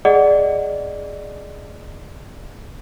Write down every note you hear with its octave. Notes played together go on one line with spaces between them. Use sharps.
G#4 D5 D#5 F#5